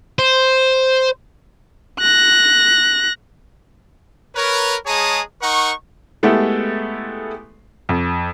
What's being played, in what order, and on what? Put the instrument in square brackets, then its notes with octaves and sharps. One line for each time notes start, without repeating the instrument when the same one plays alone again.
[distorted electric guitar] C5
[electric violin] F#6 A#6
[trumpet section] A#4 B4 C#5
G#3 G#4 C#5 A5 A#5 D#6
D#4 A#4 F#5 C#6
[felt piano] G#3 A3 B3 E4 G4 A4
F2